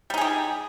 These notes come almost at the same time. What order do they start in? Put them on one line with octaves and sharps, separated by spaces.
G3 D#4 G#4 G4